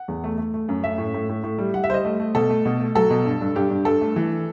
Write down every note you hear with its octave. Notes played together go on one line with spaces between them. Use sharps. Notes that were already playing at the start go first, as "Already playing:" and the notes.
Already playing: F#5
E2
A3
A3
A3
F#2
A3 E5
A2
A2
A2
A2
G3
G3 F#5
E5
G3 C5 D#5
A3
A3
B2 A4
A3
B2
A3
F#3 A4
B2
G2
G2
G2 G4
G2
G2 A4
A3
E3